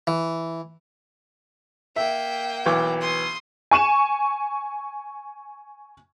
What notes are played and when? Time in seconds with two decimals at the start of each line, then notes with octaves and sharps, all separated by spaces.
0.07 E3
1.96 A#3 E5 G5
2.66 B1 E3 D6
3.01 C6 D#6
3.71 G#5 C#6 D#7 E7